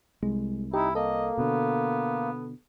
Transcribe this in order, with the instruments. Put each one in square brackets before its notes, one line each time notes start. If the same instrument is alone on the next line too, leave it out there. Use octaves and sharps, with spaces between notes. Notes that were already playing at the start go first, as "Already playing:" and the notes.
[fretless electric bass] C2 [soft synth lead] G#3
[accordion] D#4 [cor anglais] E4 [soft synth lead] G4
[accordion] A#3 [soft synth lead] A4 [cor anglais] D#5
[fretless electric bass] B2 D3 [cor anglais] B3